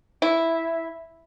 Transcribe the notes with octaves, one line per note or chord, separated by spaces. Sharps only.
E4